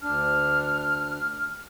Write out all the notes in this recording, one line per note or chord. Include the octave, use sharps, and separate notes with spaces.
D2 D4 F6